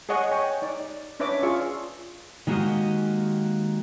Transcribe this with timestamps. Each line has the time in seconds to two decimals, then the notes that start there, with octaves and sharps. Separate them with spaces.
0.09 G#4 C#5 D#5 F#5 C#6
0.31 C#5 G5 G#5 C#6
0.62 D#4 D5
1.20 C#4 D4 B4 C#5 E5 D6
1.43 F4 G#4 D5 C#6 E6
2.47 D#3 G#3 A#3 F#4 G4 D#5